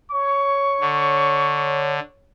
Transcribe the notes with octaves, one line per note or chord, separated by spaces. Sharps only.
C#5 C#6
D3